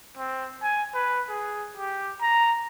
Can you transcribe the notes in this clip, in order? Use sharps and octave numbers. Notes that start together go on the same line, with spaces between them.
C4
G#5
B4
G#4
G4
A#5